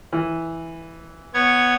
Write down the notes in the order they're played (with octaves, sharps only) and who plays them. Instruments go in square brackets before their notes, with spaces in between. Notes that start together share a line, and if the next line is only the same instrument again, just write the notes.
[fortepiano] E3
[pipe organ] B3 C#5 G#6